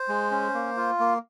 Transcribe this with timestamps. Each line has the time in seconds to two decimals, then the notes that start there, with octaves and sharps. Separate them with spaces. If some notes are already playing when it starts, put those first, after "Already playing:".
Already playing: C5
0.08 G#3
0.31 C#4
0.54 A#3
0.77 F4
1.00 A#3